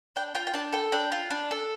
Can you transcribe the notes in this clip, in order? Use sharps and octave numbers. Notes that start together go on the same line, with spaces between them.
D4 G5
F4 G5
G5
D4 A5
A4 G5
D4 G5
F4
D4
A4